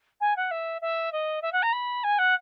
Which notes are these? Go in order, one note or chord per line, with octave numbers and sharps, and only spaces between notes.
G#5
F#5
E5
E5
D#5
E5
F#5
A#5
B5
G#5
F#5